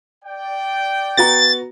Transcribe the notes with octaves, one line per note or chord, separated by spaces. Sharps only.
D5 G5
B3 F#4 A#5 A6